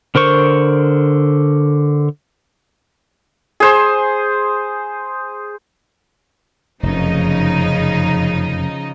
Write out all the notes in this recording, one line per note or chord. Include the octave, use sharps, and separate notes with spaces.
D3 A#4 C5 C#6
G#4 C5
F1 F#2 C#3 F3 D#4